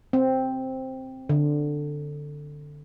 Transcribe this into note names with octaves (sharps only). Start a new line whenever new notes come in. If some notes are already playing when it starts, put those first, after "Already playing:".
C4
D3